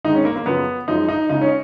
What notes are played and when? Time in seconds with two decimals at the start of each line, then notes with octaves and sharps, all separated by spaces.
0.05 G#2 D#3 G#3 D#4
0.15 C#4
0.25 A#3
0.36 A#3
0.46 F#2 C#3 F3 B3
0.88 F#2 F3 G#3 D#4
1.09 D#4
1.30 C#2 C#3 G#3 D#4
1.42 C#4